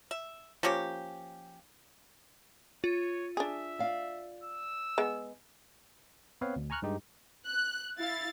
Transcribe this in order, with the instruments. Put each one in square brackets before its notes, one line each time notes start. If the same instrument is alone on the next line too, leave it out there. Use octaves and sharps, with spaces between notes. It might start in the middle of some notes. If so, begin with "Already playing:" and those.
[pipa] E5
F3 A#3 C#4 G4
[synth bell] F4 [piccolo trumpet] C#5
[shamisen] D4 G#4 [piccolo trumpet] E5
[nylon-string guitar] D5 F5
[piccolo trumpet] E6
[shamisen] G#3 B3
[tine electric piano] B3 C4 B4 C#5 F5
D2
G#5 A#5 C#6 F6 F#6
G2 G#3 D#4 G4
[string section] F#6
E4 F5 A6